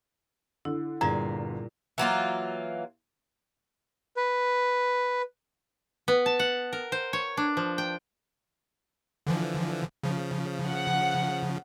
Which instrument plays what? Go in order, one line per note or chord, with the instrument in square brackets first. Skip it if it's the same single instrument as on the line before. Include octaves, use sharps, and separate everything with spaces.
[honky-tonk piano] D3 [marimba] E4
[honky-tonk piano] G1 [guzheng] A#2 [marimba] G3 G#4 [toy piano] A#5
[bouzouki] E3 F#3 A#3 F4
[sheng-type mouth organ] B4
[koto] B3
A5
F#5
A#4
C5
C#5
D4
F3
G5
[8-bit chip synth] D3 E3 F3
C#3 F3
[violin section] F#5